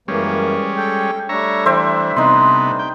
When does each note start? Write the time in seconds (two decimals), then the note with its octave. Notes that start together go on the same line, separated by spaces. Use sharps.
0.08 F#2 E3 G3 G#3 A#3 C#4
0.77 A4 G5
1.29 G3 A3 D4 C#5 E5 A#5
1.66 E3 C5 E5 G5
2.16 C3 B3 D#4 C6
2.79 G5